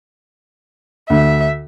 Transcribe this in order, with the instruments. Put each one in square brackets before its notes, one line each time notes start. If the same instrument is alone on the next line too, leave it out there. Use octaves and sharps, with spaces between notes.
[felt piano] D2 [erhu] E5